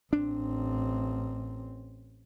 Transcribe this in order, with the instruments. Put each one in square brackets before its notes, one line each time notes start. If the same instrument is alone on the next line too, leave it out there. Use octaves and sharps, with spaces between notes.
[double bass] A1 C4 [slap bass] D4